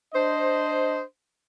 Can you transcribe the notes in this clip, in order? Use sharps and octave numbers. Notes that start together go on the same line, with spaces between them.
D4 C5 D#5